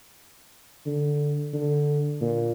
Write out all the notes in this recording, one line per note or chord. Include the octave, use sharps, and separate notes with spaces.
D3
D3
A#2